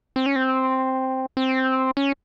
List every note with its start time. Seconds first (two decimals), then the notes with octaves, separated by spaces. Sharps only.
0.16 C4
0.26 C#4
0.36 C4
1.37 C4
1.97 C#4